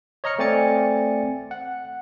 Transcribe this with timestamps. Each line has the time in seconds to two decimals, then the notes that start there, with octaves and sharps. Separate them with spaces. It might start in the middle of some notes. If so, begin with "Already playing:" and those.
0.24 C#5 D#5 A#5 F6 C#7
0.39 A3 C4 D5 G#5 A6 C#7
1.51 F#5